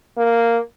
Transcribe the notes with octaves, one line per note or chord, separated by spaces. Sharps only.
A#3